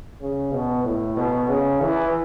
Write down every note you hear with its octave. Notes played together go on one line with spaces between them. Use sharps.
C#3
B2
A2
B2
C#3
E3